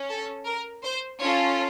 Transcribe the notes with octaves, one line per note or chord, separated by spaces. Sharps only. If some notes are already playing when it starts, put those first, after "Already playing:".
Already playing: C#4
A4
A#4
C5
C#4 F4 A4 C#5